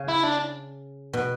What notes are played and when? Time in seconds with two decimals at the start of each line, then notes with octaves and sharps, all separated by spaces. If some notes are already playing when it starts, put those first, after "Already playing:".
Already playing: C#3
0.08 E4
0.23 D4
1.13 B2